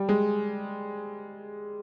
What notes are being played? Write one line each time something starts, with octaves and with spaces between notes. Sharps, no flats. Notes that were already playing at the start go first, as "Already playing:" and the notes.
Already playing: G3
G#3